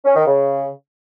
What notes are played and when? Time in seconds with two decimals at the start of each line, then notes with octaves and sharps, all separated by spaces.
0.05 C#4
0.16 D#3
0.27 C#3